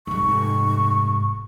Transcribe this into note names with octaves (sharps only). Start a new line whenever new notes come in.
F1 G#2 C#6